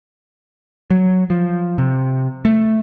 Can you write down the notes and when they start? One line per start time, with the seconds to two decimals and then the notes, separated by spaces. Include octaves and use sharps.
0.90 F#3
1.30 F3
1.78 C3
2.45 A3